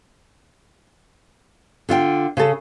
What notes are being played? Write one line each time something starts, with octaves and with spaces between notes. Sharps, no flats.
D3 F4 E5 G5
C#3 G#4 A4